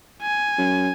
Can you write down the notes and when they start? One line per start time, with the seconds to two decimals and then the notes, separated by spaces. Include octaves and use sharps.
0.22 G#5
0.58 F#2